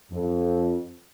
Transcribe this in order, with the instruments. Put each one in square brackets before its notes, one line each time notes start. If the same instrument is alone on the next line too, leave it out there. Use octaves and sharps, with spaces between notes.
[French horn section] F2